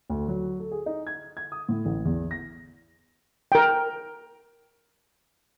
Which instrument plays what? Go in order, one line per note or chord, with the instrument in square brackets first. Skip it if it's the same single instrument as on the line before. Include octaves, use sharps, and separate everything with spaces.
[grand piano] D2
F#3
A4
G#4
D#4
G#6
G#6
D#6
A2
A1
E2
A#6
[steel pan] A#4 G5